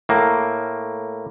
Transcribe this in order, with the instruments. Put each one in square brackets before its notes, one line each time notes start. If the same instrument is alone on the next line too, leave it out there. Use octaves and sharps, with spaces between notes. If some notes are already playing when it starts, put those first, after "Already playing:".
[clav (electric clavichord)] A2 A#3